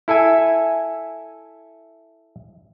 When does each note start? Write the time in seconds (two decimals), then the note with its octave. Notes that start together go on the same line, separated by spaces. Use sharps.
0.08 E4 A4 E5 G#5